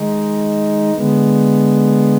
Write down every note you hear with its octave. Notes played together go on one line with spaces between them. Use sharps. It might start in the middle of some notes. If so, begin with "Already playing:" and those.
Already playing: D#3 G#3 D#4
D3 G#3 B3